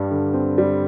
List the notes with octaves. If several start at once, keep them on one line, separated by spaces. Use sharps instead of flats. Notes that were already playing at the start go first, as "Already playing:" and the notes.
Already playing: G2 G3
D3
C4
G3